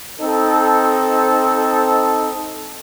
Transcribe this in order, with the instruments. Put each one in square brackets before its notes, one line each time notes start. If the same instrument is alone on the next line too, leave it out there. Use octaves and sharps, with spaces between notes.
[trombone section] C4 D#4 A4